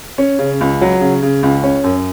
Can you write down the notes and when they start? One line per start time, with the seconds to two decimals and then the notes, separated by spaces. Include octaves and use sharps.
0.18 C#4
0.39 C#3
0.61 C#2
0.81 F#3
1.01 C#3
1.22 C#3
1.43 C#2
1.63 C#4
1.84 F#2